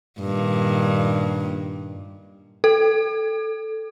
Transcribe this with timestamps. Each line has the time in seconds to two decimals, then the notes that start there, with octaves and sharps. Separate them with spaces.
0.21 G2 A#2 D#3
2.64 A4